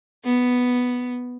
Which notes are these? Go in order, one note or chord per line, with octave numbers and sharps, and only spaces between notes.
B3